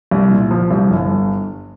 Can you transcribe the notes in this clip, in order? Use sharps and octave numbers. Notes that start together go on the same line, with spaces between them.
C2
A#2
F3
C2
G1